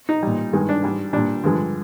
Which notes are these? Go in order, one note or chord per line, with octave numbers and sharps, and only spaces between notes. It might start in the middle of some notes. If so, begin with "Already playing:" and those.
D#4
A#2 G3
G2 D#3 G#3
D4
G#2 G3
A#2 G3 D4
G2 D3 F3 G#3